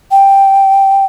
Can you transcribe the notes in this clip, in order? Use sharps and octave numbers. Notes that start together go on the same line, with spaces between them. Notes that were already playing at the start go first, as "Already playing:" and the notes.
G5